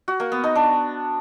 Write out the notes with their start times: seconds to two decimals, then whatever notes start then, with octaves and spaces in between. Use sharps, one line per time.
0.08 F#4
0.20 A#3
0.32 B3
0.44 D#4
0.56 D4